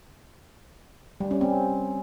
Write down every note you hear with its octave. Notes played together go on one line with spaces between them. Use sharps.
G3
C#4
C4